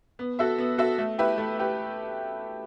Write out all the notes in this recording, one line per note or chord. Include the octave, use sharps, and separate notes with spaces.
B3
F#4 A4 E5
B3
F#4 A4 E5
A3
E4 G4 B4
A3
E4 G4 B4